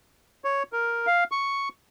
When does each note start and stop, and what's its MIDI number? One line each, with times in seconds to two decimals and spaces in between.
0.44 0.63 73
0.73 1.06 70
1.07 1.24 77
1.32 1.69 85